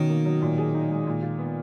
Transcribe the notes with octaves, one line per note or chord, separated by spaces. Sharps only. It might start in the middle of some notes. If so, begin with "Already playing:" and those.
Already playing: B2 D#3 C#4
A#3
F#3
A#2
G#4
D#4
G#3
A#2
F4
B3